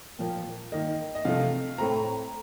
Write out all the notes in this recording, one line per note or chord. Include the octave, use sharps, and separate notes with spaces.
A#2 F3 A#3 G5
D#3 A#3 D#5
D#5
C3 F3 A3 F5
A2 A3 C4 A#5